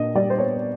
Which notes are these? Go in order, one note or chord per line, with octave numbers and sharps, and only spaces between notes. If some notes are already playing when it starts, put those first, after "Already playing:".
Already playing: A#2 D4 D#5
G3 D5
C5
B3 C#5